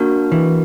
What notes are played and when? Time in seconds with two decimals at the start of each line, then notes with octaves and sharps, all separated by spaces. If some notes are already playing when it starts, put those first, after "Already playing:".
Already playing: A#3 D4 F#4 A#4
0.32 E3